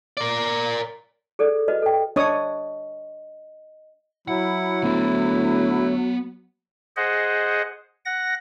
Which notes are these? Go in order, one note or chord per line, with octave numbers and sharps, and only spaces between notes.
A#4 D5
G#4 A4 D5
F#4 B4 D#5
A4 G5
D4 C#5 D#5 D#6
F#3 E4 F#5
D2 B3 C5
G#4 C5 D#5 F#5
F#5 A#6